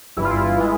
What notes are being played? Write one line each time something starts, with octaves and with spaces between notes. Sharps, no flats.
G1 G2 E3 E4
F4
E4
E3 G#3